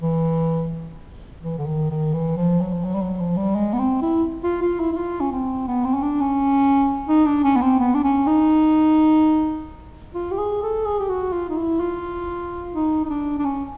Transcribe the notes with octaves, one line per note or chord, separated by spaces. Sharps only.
E3
E3
D3
D#3
D#3
E3
F3
F#3
F3
F#3
G3
F#3
F3
G3
G#3
B3
C4
E4
F4
F4
E4
E4
F4
C#4
C4
B3
C4
C#4
D4
C#4
D#4
D4
C#4
B3
C4
B3
D4
C#4
D#4
F4
G4
G#4
A4
G#4
G4
F#4
F4
D#4
E4
F4
D#4
D#4
D4
D4
C#4